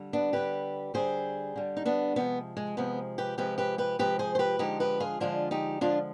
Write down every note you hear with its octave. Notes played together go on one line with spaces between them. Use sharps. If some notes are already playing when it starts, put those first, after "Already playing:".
Already playing: D3 G3
B3 D4
D3 G3 G4 B4
D3 G3 G#4 C5
D3 G3
D#4
B3 D4
C3 F3 G#3 B3
G#3
C3 F3 G#3 B3
G4 B4
C3 F3 G#3 G4 B4
G4 B4
G4 B4
C3 F3 G#3 G4 B4
G#4 C5
C5
G4 B4
D3 F3 G#3 D#4 G4
G4 B4
F4 G#4
D3 F3 G#3 D4 F4
D#4 G4
D3 F3 G#3 D4 F4